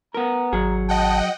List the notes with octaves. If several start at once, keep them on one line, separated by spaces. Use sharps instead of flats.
B3 A#4 A#5
G#1 F#3 G#4
D#5 F#5 G5 A5